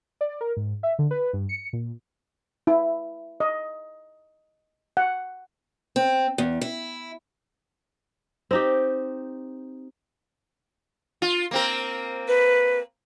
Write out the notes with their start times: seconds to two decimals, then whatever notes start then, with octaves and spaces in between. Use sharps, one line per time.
0.21 D5
0.41 A#4
0.57 G#2
0.83 E5
0.99 D3
1.11 B4
1.33 G2
1.49 C#7
1.73 A#2
2.67 E4
3.40 D#5
4.97 F#5
5.96 C4
6.38 E2
6.61 E4
8.51 C4 D#4 G4
11.22 F4
11.51 A#3 C4 A#4
12.28 B4